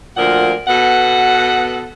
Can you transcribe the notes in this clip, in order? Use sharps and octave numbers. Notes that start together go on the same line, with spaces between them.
D2 A#2 F3 A#4 F#5
B2 B3 A4 F#5